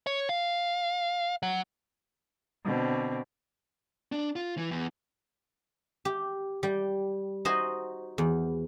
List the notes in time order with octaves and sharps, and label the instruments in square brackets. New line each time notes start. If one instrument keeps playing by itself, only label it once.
[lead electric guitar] C#5
F5
F#3
[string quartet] B2 D3 C4
[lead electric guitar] D4
F4
E3
E2
[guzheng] G4
G3 G5
D#4 F#4 C5 D#5 G#5
E2